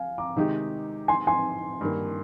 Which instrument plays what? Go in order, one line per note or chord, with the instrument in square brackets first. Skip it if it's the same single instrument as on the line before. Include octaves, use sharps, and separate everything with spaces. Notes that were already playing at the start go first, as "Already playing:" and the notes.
Already playing: [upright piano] F5 G#5
A#5 D6
[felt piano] C3 D#3 G#3 D#4 G4
[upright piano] G#5 C6
G#5 C6
[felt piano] G2 D#3 A#3